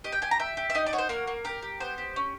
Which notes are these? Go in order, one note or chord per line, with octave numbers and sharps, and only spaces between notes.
G4 D#5
G5
G4 G#5
A#5
G4 E5
G4
E5
D#4 D#5
D5
F#4 C#5
C5
A#3 A#4
A#3
G4 A#4
G4
B3 C5
G4
C#4